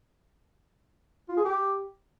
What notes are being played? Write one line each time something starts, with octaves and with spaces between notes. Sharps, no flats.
F4
G#4
G4